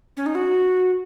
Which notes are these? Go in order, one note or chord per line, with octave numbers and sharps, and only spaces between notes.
C#4
D#4
F#4